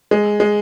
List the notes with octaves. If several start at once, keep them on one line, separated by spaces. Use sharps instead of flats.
G#3
G#3